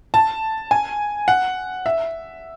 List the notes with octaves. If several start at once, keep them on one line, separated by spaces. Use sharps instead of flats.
A5
G#5
F#5
E5